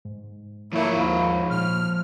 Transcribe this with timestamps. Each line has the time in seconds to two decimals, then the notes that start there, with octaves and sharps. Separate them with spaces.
0.05 G#2
0.73 F3 A3 A#3 E4 C#5
0.97 D#2 G#2 F5 B5
1.51 A#2 F6